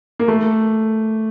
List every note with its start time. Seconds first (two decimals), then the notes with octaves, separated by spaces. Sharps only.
0.19 A#3
0.28 A3